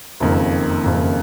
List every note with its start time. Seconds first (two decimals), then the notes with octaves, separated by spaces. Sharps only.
0.20 F#1 F2 D#3 A#3
0.84 F#1 F2 D#3 A#3